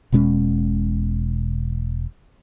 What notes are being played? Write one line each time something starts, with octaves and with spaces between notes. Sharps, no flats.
E1 B2 G#3 C#4